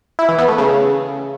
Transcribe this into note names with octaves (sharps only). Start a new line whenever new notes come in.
E4
E3
B3
A3
C#3